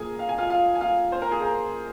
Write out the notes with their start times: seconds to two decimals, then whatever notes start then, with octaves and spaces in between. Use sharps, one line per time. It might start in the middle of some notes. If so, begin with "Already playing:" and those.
Already playing: A#2 F3 G#4 A#4 G#5
0.19 F5
0.29 G#5
0.38 F4 F5
0.50 F4 F5
0.75 G#5
0.81 F4 F5
1.12 C5
1.22 A#4
1.31 G#4
1.42 A#4